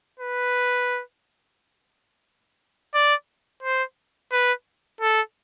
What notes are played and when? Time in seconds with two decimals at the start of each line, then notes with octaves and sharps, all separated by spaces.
0.19 B4
2.94 D5
3.63 C5
4.32 B4
5.01 A4